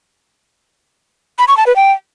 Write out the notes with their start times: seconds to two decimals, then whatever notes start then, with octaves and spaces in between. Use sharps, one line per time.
1.39 B5
1.48 C#6
1.57 A5
1.67 B4
1.76 G5